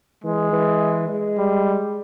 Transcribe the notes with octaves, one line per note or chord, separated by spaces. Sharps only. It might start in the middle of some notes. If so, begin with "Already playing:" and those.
E3 G#3
E3
G#3
G3